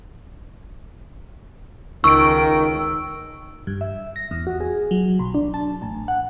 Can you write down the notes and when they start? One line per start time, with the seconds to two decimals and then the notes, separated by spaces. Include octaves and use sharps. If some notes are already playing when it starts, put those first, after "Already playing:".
2.04 C#2 D#3 C#6 E6 D7
3.67 G2
3.81 E5
4.16 A#6
4.31 E2
4.47 F#4
4.60 G#4
4.91 F#3
5.19 B1
5.34 D4
5.54 A5
5.82 A1
6.08 F#5